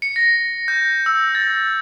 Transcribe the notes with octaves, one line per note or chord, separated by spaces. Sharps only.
C#7
A#6
G6
E6
A6